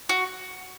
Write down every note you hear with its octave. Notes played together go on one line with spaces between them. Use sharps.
F#4